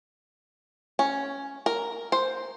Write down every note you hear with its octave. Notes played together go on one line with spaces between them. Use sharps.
C#4
A#4
C5